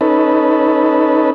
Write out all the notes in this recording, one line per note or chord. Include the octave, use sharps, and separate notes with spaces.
C#4 D#4 A4 B4